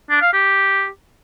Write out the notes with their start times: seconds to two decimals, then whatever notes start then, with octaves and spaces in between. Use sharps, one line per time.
0.10 D4
0.22 F5
0.33 G4